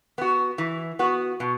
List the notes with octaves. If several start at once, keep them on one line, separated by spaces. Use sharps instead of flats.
B3 F#4
E3
B3 F#4
B2